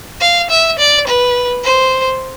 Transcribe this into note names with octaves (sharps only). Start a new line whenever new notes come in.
F5
E5
D5
B4
C5